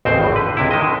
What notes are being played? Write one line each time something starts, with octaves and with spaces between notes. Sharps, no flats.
A1 D#2 C#3 C4 C5
G#1 E2 A2
D3 B4
C#2 C3 E4
D#3 G#3 D#5
D3